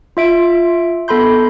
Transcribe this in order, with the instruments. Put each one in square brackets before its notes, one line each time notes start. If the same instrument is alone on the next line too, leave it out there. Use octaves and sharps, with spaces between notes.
[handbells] F4 E5 D7
B3 A4 B5 C6 G6